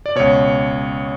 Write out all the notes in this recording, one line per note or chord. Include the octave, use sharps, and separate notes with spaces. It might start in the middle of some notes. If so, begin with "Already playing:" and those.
D5
C#2 B2 C#5